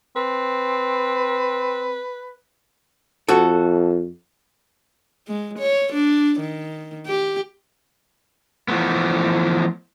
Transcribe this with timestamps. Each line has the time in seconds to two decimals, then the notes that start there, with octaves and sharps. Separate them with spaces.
0.16 C4 B4
3.29 F2 F#4 A4
5.28 G#3
5.59 C#5
5.93 D4
6.40 D#3
7.06 G4
8.68 E3 F3 A3 B3